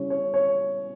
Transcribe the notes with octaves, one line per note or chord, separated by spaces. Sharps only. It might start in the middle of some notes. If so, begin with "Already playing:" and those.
Already playing: C#3 G3 C#4 E4 C#5
C#5
C#5